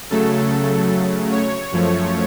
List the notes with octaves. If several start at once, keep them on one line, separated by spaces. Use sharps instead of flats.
C#3 F#3 A3 A4
C#5
F#2 F3 A3